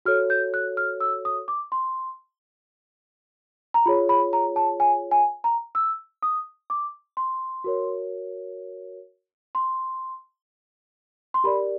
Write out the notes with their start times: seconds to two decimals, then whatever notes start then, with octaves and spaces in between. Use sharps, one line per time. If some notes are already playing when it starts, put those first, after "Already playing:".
0.05 F#4 A4 C#5 F6
0.30 G6
0.54 F#6
0.77 F6
1.00 E6
1.25 D#6
1.48 D6
1.72 C6
3.74 A#5
3.86 F4 G#4 C#5 B5
4.09 B5
4.33 A#5
4.56 A5
4.80 G#5
5.11 G#5
5.44 A#5
5.75 E6
6.23 D#6
6.70 D6
7.17 C6
7.64 F#4 A#4 C#5
9.55 C6
11.34 C6
11.44 G4 A#4 D5 B5